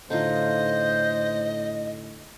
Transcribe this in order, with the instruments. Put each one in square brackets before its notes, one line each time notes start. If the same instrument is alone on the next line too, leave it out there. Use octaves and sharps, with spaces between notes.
[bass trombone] A2 [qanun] D3 D#4 F4 [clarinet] C5 [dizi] D#5